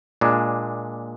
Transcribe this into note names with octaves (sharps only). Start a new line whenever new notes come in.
A#2 G#3 D4